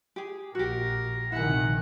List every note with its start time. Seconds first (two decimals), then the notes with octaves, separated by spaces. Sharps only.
0.16 G4 G#4
0.55 A#1 F#4 G4 A#4
1.32 A#1 C3 D#3 E4 F#5 G#5